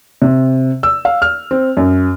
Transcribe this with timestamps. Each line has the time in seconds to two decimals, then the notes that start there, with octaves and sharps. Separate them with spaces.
0.22 C3
0.83 E6
1.05 F5
1.22 F6
1.51 C4
1.77 F#2